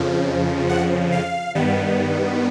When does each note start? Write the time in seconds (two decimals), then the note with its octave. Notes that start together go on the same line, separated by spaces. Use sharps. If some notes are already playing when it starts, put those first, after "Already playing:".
Already playing: F2 C#3 F3
0.69 F#5
1.12 F5
1.55 G2 D#3 G3 B3